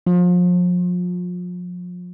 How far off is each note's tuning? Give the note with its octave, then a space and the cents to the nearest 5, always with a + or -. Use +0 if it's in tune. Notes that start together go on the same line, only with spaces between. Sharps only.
F3 +35